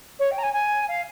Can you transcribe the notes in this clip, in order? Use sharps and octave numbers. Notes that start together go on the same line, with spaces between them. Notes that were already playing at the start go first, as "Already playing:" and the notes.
C#5
G5
A#5
G#5
G#5
F5